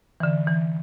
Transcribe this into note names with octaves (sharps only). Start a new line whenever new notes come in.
D3 E3
E3